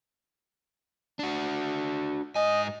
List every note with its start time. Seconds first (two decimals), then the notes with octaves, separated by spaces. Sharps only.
1.19 D4 F#4
2.36 G#2 D#5 G#5